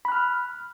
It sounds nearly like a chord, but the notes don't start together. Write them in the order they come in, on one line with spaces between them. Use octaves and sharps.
B5 F#6 F6